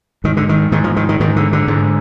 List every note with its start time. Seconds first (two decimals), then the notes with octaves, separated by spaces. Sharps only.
0.24 G#2 D#3
0.37 D3
0.49 D#3
0.72 G#2 D#3
0.84 F3
0.96 D#3
1.09 D#3
1.20 G#2 D#3
1.36 D3
1.53 D3
1.68 G#2